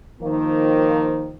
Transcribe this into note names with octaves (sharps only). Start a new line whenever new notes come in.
D#3 F3 A#3